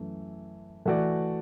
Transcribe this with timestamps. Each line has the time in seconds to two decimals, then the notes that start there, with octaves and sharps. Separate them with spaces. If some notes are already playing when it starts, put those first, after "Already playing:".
Already playing: F#2 E3 A3
0.86 E3 A3 F#4 D5